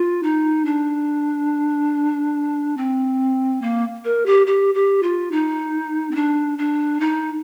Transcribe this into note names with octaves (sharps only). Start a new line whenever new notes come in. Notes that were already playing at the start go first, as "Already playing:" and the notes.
Already playing: F4
D#4
D4
C4
A#3
A#4
G4
G4
G4
F4
D#4
C4
D4
D4
D#4